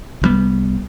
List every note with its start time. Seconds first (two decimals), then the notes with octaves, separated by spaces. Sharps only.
0.21 C2 C3 G3 B3